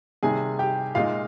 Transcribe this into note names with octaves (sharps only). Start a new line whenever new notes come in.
C3 D#3 G3 G#4 G#5
G4 G5
A#2 G#3 D#4 F4 F5